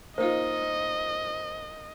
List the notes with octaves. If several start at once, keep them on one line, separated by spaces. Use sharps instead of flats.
A#3 D#4 F4 C5 D#5